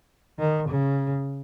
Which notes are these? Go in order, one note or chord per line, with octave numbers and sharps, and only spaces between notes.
D#3
C#3